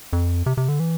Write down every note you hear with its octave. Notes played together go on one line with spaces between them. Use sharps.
F2
C3
C3
D3
E3